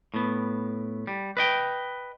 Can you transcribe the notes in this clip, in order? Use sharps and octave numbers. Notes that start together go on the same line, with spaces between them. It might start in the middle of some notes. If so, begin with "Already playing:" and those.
A2 B3
G3
B4 D#5 G5